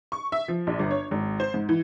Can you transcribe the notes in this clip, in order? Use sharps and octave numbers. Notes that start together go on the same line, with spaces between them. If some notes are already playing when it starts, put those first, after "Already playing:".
C#6
E5
F3
A#1
G1
C#5
G#1
C5
G#2
E3